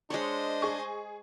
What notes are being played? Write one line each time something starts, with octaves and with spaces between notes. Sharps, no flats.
G#3 D4 C5 C#5 D#5
G#4 G#5 C#6